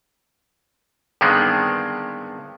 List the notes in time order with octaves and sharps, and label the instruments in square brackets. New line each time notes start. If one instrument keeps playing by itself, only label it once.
[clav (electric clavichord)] G2 D3 D#3 G#3 B3 C4